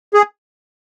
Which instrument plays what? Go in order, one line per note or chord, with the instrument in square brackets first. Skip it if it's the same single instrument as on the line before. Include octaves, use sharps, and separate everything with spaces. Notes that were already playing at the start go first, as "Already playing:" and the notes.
[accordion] G#4